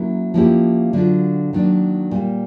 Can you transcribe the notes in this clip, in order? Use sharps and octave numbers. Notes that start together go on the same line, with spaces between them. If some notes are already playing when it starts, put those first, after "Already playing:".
Already playing: F#3 A#3 C#4 E4
F3 A#3 C#4 E4 G4
D3 F#3 A3 D4 F4
D#3 F#3 A#3 D4
A#2 G3 A#3